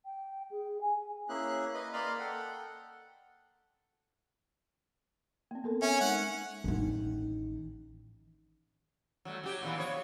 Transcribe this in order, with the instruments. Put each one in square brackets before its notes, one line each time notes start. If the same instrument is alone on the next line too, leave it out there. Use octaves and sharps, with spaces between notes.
[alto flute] G5
G#4
G#5
[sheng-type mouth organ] A#3 C#4 E4 G#4 F#6
B4 D#5
A#3 D5 D#5 B5 C6 F6
A4 F#5 G5
[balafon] A#3 C4
B3 A4 A#4
[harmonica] C#4 [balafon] E5 G#5
[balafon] G#3 D#4 [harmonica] F#5
[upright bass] A1 D#3
[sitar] F#3 G3 A3
F#3 G4
A#2 E3 B3
F3 C#5